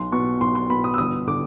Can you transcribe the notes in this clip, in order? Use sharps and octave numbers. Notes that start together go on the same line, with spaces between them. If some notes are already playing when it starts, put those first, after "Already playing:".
Already playing: B1 C6
B2 C#6
B1 C6
C6
B2 B5
D#6
E6
G1 D#6
D3 D6